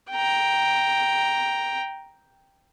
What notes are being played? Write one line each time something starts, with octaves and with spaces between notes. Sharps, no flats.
G5 A#5